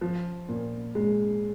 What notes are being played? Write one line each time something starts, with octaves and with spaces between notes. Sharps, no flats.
F3
A#2
G#3